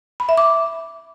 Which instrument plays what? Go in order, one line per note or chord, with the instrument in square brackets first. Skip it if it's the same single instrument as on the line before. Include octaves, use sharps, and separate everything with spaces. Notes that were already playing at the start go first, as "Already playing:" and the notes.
[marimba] B5
E5
D6